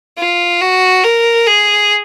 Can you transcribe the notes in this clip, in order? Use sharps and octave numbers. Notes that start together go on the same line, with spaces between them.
F4
F#4
A#4
G#4